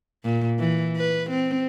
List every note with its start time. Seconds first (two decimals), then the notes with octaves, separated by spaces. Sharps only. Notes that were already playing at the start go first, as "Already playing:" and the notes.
0.24 A#2
0.59 E3
0.97 B4
1.31 C4